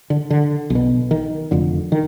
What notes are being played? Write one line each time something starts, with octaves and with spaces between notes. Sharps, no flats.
D3
D3
B1 B2
D#3
F1 F2 D3
D#3